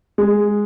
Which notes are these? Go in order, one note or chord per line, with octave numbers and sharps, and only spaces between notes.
G#3